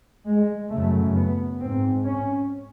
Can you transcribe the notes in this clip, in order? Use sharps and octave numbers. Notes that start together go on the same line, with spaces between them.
G#3
F#2 C#3 A3
B3
G#2 C4
C#4